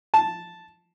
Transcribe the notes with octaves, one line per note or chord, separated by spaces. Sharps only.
A5